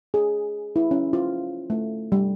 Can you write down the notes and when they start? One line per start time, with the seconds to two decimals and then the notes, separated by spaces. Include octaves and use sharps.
0.14 G#4
0.76 E4
0.91 C#4
1.13 F4
1.70 A3
2.12 G3